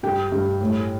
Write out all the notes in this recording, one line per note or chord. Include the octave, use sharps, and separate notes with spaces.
G2 G4 G5
G2
A2